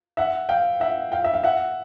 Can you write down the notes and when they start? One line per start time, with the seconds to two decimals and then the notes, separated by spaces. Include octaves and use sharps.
0.17 E5 F#5
0.49 F5 G5
0.80 E5 F#5
1.12 F5 G5
1.24 E5
1.34 F5
1.44 E5 F#5